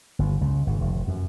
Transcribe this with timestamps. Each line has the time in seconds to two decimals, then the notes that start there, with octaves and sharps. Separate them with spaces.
0.19 G1
0.41 C#2
0.67 G#1
0.81 F1
1.08 F#2